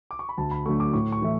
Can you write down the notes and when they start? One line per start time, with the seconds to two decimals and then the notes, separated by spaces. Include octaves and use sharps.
0.11 D6
0.19 C#6
0.29 B5
0.38 D2 A5
0.51 B5
0.66 D3 F#3 A3 C#6
0.80 D6
0.93 A2 C#6
1.12 C#6
1.22 E3 A3 E5